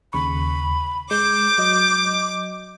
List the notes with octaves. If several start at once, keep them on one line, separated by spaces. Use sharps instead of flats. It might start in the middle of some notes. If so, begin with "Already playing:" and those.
D#2 C#3 B5 C#6
G#3 D6 G6
F#3 D#5